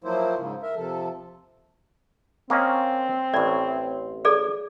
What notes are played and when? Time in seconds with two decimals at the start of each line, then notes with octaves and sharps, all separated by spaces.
0.04 F3 F#3 A#3 E4 C5
0.38 G#2 C#3
0.62 A#4 E5
0.76 C3 F3 A4
2.50 A#3 C4 C#4 D#5
3.34 A1 A2 D5
4.25 G#4 A4 D5